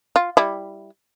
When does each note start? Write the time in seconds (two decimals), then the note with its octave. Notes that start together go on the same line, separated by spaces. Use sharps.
0.16 F4
0.37 G3 E4